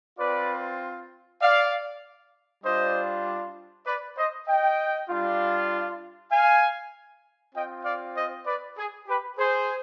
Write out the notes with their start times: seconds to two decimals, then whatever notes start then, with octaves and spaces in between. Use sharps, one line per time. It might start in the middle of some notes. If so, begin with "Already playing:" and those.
0.18 C4 F4 B4 D5
1.41 D5 F5
2.63 G3 D4 F4 C5 D#5
3.86 B4 D5
4.17 C5 D#5
4.47 D#5 G5
5.09 G3 D4 F4
6.32 F5 G#5
7.54 C4 F4 D#5 G5
7.85 D5 F5
8.16 C5 D#5
8.46 B4 D5
8.77 G#4
9.07 G4 B4
9.38 G#4 C5